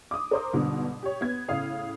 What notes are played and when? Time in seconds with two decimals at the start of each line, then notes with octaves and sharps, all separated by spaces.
0.11 D6 D#6
0.31 A#4 C5 D#6
0.53 G1 G#2 B2 D3
1.03 G4 C#5
1.21 B3 G#6
1.48 A2 C#3 F5 D#6